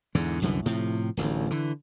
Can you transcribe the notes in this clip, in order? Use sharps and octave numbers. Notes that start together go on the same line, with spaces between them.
E2 G#2 D3
C2 F#2 D3 E3
A2 C3 F3
D1 A1 D2
D3 E3